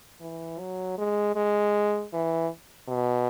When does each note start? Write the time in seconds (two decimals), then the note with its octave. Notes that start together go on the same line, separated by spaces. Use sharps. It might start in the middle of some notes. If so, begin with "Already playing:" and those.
0.21 E3
0.59 F#3
0.98 G#3
1.36 G#3
2.13 E3
2.89 B2